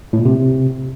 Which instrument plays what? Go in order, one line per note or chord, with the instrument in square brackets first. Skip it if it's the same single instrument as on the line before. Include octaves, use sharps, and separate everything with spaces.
[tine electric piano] A2
A#2
C3